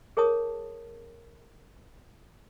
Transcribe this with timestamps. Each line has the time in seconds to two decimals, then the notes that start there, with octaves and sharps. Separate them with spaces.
0.17 G#4 A#4 C#5 A5 D#6